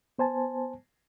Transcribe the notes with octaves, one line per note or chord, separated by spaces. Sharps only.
B3 C5 G#5 A5